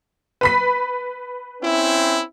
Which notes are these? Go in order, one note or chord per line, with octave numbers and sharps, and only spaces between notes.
B4 B5 B6
C4 C#4 E4